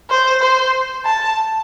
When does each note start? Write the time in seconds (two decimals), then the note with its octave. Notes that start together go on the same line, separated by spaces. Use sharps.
0.10 C5
0.42 C5
1.05 A5